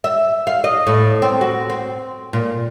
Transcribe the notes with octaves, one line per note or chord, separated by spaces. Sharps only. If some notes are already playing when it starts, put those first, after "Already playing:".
E5
F5
D#5
A2
C4
F#4
C4
A#2